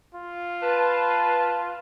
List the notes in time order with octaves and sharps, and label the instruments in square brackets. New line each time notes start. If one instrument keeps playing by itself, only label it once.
[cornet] F4
[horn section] B4 A5